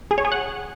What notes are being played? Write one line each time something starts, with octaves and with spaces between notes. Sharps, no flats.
G#4
C#5
G#4
F#5